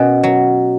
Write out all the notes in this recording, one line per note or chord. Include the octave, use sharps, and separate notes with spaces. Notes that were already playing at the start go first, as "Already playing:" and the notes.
Already playing: B2 C#4
F#3